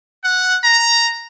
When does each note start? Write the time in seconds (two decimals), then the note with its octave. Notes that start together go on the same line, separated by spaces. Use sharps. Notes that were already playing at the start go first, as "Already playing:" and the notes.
0.23 F#5
0.63 A#5